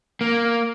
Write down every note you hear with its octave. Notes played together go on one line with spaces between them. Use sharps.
A#3